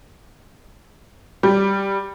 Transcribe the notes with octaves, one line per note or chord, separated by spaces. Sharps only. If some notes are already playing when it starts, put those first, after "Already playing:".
G3